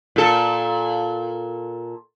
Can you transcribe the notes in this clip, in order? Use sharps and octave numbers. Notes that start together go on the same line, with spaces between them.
A#2 A4